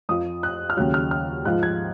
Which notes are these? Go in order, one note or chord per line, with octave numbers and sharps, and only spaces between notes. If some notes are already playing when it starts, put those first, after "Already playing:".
F2 F3 D#6
F#6
F6
D#2 C#3 F#3 F#6
F6
F6
G#2 F3 F#6
G#6